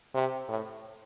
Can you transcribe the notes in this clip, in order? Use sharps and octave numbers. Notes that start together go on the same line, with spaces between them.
C3
A2